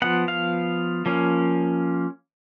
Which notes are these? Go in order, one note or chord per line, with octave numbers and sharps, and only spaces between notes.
F3 B3 F#5
F5
F3 A#3 C#4